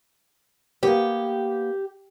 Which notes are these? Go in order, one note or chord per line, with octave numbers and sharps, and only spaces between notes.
A#3 B3 G4